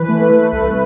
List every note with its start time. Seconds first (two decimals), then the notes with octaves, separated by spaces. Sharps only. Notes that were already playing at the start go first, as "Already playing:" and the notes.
Already playing: E3 B4
0.08 A3
0.30 A3
0.52 C2